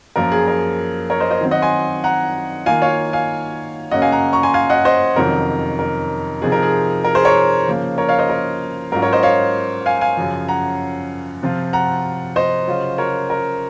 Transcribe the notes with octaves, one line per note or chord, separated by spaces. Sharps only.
F#2 F3 A#3 F4 A#4
G#4
A#4
A#4 C#5
C5 D#5
C5 D#5
D#3 F#3 C4
D#5 F#5
G#5 C6
F#5 A#5
D#3 A#3 F4 F5 G#5
C#5 F5
F5 G#5
F#2 C#3 F#3 A#3 C#4 D#5 F#5
F5 G#5
F#5 A#5
A#5 C#6
G#5 C6
F5 G#5
D#5 F#5
C5 D#5
F2 C3 D#3 F#3 C#4 A#4
A#4
C3 F3 C4 D#4 G#4
A#4
G#4
A#4
G#4 C5
A#4 C#5
C#3 F3 A#3 C#4
A#4 C#5
C#5 F5
C5 D#5
A#4 C#5
G#2 F#3 C#4 F4 A#4
A#4 C#5
C5 D#5
C#5 F5
F5 G#5
F5 G#5
F#2 C#3 F3
F#5 A#5
C3 F3 C4 F4
F#5 A#5
C5 D#5
C#3 F#3 C#4 F4
A#4 C#5
A#4